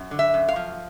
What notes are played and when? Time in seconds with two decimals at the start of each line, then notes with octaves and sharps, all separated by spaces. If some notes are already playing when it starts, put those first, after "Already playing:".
Already playing: F#2
0.11 D3
0.19 E5
0.34 F#2
0.49 F5
0.56 F3